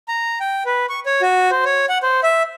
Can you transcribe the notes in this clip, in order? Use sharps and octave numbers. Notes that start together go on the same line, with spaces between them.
A#5
G5
B4
C#6
C#5
F#4
C5
C#5
F#5
C5
E5